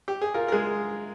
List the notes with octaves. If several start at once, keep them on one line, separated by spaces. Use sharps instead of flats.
G4
G#4
F4 A#4
A#4
G#3 G#4